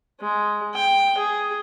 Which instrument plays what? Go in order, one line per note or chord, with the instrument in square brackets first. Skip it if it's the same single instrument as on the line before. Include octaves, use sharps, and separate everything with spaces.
[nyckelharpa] G#3
G5
G#4